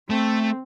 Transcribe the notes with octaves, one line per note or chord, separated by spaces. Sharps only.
A3 C4